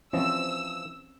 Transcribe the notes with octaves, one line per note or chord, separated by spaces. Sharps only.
E3 F3 C4 C#4 D#5 E6